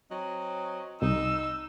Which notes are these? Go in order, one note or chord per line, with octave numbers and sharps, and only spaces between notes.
F#3 C4 D#5
C2 D#4 E6